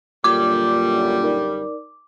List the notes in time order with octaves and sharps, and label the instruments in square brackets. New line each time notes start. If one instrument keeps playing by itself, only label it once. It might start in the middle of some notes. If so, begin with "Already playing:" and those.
[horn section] F#2 D3 G3 [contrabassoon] A#2 [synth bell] D6
[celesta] D#4 A#4 D5